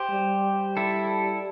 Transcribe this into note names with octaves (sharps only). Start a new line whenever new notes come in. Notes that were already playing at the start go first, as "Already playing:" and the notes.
Already playing: G4 C5
G3
E4 A4